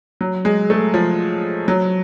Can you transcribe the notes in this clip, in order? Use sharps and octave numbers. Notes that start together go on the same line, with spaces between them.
F#3
G#3
A3
F3
F#3